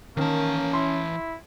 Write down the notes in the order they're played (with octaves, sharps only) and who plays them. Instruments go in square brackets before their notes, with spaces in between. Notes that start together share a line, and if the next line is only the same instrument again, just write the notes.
[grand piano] D#3 [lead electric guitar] E3 A5 [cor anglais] A#3 [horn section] C#4
[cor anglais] E4 [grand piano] C6